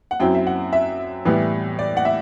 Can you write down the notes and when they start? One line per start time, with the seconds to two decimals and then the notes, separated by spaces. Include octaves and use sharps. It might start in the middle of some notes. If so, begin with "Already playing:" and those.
0.11 F#5
0.20 F#2 F#3 C4 E4 G5
0.35 E5
0.47 F#5
0.73 E5
1.25 A2 E3 G3 B3 E4
1.79 D5
1.97 F#5
2.05 E5